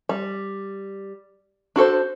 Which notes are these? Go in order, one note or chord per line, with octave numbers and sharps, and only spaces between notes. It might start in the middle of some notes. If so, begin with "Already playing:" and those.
G3
D4 F#4 A4 C5